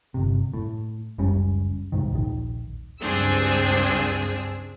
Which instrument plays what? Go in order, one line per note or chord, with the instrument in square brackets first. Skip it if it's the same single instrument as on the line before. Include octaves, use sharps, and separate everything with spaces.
[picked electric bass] G1 C3
A2
F#1 C#2 G3 C#4
C2 G#2 D#3
D#1 A#1 D#3
[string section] C#2 G2 C4 D4 G#4 E6